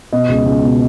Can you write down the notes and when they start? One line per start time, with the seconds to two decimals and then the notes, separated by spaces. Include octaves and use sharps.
0.13 B2 D#5
0.29 C#2
0.46 C#2
0.64 B2